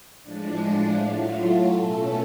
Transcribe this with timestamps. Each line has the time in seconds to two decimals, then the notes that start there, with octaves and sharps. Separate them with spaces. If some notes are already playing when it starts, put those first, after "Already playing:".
0.23 A2 F3 G#3 D4
0.97 A2 F#3 A3 F4
1.72 B2 A3 C#4 A4